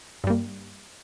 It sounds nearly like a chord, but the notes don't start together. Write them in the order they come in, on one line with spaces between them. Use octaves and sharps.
G2 G3 A#3